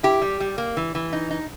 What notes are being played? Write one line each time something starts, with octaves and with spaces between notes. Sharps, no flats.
E4 G4
G3
G3
A#3
E3
E3
D#4
D#4